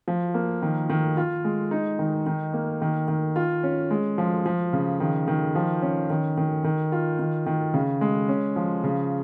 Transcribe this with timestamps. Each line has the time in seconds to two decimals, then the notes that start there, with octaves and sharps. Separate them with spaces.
0.08 F3
0.34 A#3
0.62 D#3
0.90 D#3
1.17 F4
1.44 G#3
1.71 D#4
1.99 D#3
2.26 D#3
2.54 A#3
2.82 D#3
3.08 D#3
3.36 F4
3.63 C#4
3.91 G#3
4.18 F3
4.46 F3
4.73 C#3
5.00 D#3
5.28 D#3
5.55 F3
5.82 C#4
6.10 D#3
6.37 D#3
6.64 D#3
6.92 F4
7.19 D#3
7.46 D#3
7.74 C#3
8.01 G#3
8.29 C#4
8.56 F3
8.84 C#3